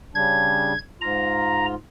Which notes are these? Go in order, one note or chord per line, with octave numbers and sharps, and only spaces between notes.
C#3 G3 D4 G#6
G#2 F4 A#5